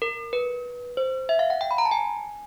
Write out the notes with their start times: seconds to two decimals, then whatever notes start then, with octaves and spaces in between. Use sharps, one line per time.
0.02 A#4
0.33 B4
0.97 C5
1.29 E5
1.39 F5
1.50 F#5
1.61 G5
1.71 B5
1.78 A#5
1.85 A5
1.91 G#5